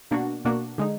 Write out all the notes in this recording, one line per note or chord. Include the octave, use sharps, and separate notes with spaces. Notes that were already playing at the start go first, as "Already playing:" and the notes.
B2 A#3 D4 F#4
B2 A#3 D4 F#4
D3 G#3 D#4